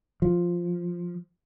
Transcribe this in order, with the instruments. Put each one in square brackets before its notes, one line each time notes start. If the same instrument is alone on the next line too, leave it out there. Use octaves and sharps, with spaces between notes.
[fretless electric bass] F3